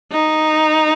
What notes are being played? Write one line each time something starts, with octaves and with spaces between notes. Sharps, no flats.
D#4